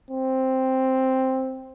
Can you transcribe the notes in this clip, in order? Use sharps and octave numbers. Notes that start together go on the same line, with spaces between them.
C4